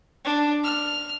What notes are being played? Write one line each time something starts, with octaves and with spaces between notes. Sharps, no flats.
D4
F6